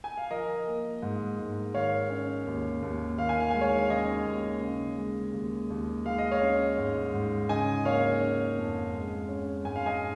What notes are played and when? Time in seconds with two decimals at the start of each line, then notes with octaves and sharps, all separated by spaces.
0.04 G#5
0.17 F5
0.30 F3 A#4 D#5
0.67 A#3
1.02 G#2
1.39 G#2
1.75 D#3 C#5 F5
2.10 C#4
2.47 D#2
2.82 D#2
3.18 D#3 F5
3.29 G#5
3.40 F5
3.50 G#3 G#5
3.61 C#5 F5
3.79 F5
3.90 C#4 D#5 G#5
4.26 D#2
4.62 C#3
4.98 G#3
5.34 D#2
5.70 D#2
6.06 G#3 F5
6.18 D#5
6.31 C#5 F5
6.42 C#4
6.78 G#2
7.14 G#2
7.49 C#3 D#5 G#5
7.85 A#3 C#5 F5
8.21 C#4
8.58 F2
8.94 G#3
9.29 C#4
9.65 G#2 G#5
9.76 F5
9.86 D#5 G#5